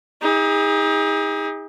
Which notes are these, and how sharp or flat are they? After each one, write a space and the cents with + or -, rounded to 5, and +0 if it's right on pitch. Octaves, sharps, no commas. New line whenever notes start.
D#4 +35 G#4 -35